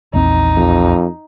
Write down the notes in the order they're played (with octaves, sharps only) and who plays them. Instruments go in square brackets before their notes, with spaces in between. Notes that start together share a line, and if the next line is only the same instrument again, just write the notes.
[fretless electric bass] A#1 E2 C4 [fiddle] D#4
[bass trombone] F2